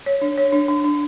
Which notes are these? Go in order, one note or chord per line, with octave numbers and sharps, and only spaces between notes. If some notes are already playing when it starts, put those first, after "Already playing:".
C#5
D4
C#5
D4
D4
D4